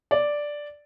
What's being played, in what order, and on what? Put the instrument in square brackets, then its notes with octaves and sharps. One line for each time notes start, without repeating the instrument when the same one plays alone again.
[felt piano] D5